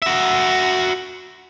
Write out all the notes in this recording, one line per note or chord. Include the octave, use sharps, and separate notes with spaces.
F#4 E5